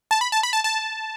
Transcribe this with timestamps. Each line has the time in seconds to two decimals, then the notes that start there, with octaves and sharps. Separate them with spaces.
0.11 A5
0.21 B5
0.32 A5
0.43 B5
0.53 A5
0.64 A5